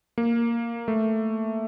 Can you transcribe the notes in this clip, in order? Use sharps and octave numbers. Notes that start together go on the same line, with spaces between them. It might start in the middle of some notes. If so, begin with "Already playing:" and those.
A#3
A3